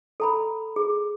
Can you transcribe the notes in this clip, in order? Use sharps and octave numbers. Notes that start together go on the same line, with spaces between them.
A4 A#5 B5
G#4